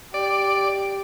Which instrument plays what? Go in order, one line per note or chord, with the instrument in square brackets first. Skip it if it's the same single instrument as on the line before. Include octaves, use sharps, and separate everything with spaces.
[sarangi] G4 [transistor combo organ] D5